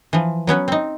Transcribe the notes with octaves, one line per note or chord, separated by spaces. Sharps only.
E3 F3
F#3 B3 C#4 B4
C4 D#4